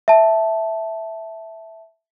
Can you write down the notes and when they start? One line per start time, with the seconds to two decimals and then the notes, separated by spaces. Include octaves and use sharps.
0.08 E5 A5